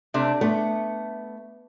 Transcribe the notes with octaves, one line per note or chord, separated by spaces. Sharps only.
C3 A3 D4
A3 B3